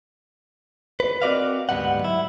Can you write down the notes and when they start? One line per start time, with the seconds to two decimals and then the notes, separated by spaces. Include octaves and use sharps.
1.00 B4
1.22 C4 F#4 A#4 D5 D#5 F5
1.69 D2 G#2 E3 G3 B3 F#5
2.01 F#3 E4